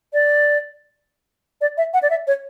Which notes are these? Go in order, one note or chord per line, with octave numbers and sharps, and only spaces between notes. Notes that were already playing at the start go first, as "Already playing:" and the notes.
D5
D5
E5
F#5
D5
E5
C#5